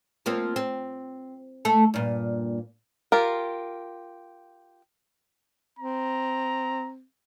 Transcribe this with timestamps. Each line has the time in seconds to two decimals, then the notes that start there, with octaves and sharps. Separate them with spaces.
0.26 F3 A#3 C4
0.56 C4
1.65 A3 A4
1.94 G2 A#2
3.12 F4 G4 A#4
5.79 C4 A#5